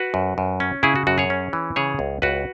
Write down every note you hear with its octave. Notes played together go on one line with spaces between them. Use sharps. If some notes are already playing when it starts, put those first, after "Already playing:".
Already playing: F#4 B4
F#2
F#2
C#4
C#3 E4 G#4
F#4
F#2 F#4
G#4 C#5
C#4
E3
C#3 G#4 C#5
C#2
C#2 F#4 B4